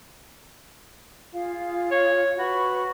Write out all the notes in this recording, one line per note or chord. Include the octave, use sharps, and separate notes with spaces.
F4 G#4 F5
C#5
F#4 B4 B5 C#6